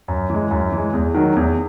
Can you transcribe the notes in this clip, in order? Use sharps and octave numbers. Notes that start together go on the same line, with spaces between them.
F#2
E3 G#3
F#2
E3 G#3
E2
D#3 F#3
E2